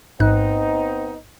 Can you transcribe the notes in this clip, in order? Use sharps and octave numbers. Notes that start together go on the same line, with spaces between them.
A1 G#2 B3 C4 D#4 F#6